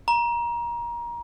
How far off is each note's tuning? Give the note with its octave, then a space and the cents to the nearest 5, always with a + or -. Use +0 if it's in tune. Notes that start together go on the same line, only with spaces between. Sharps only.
A#5 +25